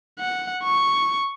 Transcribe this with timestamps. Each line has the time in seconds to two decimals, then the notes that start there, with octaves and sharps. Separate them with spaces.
0.19 F#5
0.63 C#6